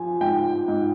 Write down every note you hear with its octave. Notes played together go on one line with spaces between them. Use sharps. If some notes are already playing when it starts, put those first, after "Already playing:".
Already playing: F3 G#5
G#2 G5
G#2